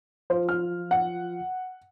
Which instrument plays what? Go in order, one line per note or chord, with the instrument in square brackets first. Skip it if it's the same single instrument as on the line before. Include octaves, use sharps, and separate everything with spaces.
[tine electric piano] F3 F4 [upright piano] C5
[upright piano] F6
F#5